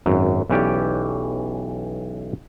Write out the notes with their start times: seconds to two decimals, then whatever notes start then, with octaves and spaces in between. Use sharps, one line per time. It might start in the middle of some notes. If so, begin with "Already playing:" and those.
0.06 G#1 F#2
0.50 B1 E3 C#4 G4 D5